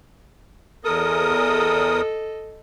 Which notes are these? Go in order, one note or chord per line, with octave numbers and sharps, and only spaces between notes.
E2 A4 A#4 D#5 D#6